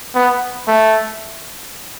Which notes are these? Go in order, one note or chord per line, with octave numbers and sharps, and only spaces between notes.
B3
A3